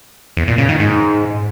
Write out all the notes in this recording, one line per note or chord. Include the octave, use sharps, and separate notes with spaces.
E2
A#2
C#3
D#3
G#2